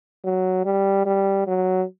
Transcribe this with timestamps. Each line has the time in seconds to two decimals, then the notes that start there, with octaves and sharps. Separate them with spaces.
0.24 F#3
0.65 G3
1.06 G3
1.47 F#3